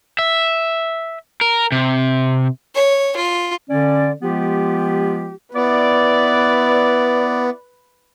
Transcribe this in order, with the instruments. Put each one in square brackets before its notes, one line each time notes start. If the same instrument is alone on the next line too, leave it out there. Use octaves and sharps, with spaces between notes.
[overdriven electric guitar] E5
A#4
C3
[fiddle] C#5
F4
[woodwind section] D3 C#4 D5
F3 G#3 B3 F4 G4
[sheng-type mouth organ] B3 [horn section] E4 D5 [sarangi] B4